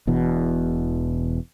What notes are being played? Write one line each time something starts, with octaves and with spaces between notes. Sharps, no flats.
E1 E2 B2